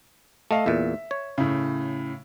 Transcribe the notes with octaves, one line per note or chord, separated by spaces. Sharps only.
A3 A4 D#5 F5
E2 A#2 E5
C#5
A2 C#3